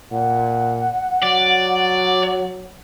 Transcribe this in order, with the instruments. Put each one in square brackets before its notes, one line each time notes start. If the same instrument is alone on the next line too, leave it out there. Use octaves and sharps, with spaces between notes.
[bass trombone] A#2 [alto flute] F#5
[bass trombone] F#3 [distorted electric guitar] D5